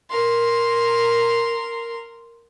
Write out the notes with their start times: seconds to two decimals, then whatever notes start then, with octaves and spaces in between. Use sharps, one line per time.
0.10 A#4 C6